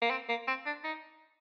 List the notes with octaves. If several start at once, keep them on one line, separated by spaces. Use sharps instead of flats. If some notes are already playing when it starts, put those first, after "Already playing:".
A#3
C4
A#3
C4
D4
D#4